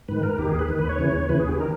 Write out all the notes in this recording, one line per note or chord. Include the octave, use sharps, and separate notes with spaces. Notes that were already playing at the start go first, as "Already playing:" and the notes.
G#2 D#3 B4
A#4
D#2 D#3 G4
G#4
B4
D#2 D#3
B4
C#5
D#2 C#3 E3
D#2 C#3 E3 B4
G#4
G4
D#3 A#4